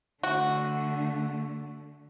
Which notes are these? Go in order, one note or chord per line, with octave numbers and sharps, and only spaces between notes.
D3 A3 F#4